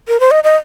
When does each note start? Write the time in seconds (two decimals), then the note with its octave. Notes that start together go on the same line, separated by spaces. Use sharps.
0.08 A#4
0.20 C5
0.31 D#5
0.44 D#5